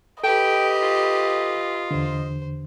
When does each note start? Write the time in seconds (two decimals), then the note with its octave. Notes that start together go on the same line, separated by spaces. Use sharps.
0.24 G4 A4 B4 D#5 G5
0.82 F4
1.91 E2 D3 C5